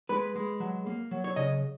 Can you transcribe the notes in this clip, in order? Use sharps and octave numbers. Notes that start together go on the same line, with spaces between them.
G#3 B4
G#3
F#3
A#3
F#3
C#5
C#3 D#5